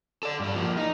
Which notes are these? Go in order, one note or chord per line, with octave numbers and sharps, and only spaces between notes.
A4 D5
G2 G3
F3 A#3
D#4